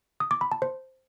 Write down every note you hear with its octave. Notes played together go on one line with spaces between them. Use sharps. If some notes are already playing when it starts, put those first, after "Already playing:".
D#6
D6
B5
A5
C5